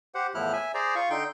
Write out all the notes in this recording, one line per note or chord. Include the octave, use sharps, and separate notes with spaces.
G4 C5 F#5
E2 A2 F3 E4 F6 F#6
E5 G#5
G#4 C5 D5 A#5
F4 F5 C#6
D3 D#4 G5 C6 G6